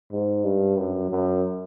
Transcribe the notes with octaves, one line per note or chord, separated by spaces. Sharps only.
G#2
G2
F#2
F#2